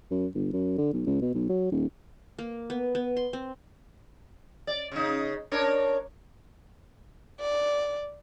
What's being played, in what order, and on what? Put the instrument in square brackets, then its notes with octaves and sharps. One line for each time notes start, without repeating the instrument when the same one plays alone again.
[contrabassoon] F#2
G1
F#2
D3
B1
C#2
B2
B1
F#3
D#1
[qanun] A#3
B3
B3
C6
C4
[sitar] D5
C#3 D#4
D4 A#4 C#5
[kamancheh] D5